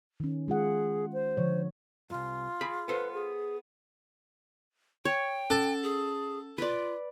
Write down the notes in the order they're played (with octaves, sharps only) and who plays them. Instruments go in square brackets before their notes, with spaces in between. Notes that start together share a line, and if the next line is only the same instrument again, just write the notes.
[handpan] D#3 C#4
[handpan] G#3 F4 F#5 [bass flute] G#4
[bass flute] C5
[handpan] D3 F3 C#5
[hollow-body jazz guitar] C2 F#2 [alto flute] F4
[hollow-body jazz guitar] G#4 B5
[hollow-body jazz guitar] B3 A4 C5 [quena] B4
[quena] G#4
[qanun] C#5 [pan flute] G5
[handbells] C#4 A6 [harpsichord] A4
[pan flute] G#4
[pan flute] F4 [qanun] B4 D5